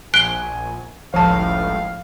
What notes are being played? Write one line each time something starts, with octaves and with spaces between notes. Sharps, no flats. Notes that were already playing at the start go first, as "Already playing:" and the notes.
A#1 G#5 F#6 D7 G7
G1 C#2 A2 F3 F5 A5